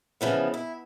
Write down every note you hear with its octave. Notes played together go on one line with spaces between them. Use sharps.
C#3 E3 F3 B3
E4